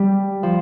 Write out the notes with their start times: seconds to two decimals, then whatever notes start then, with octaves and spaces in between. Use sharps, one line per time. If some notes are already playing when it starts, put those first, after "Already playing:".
Already playing: G3
0.43 F3